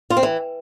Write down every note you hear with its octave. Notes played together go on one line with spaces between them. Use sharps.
F4
C4
E3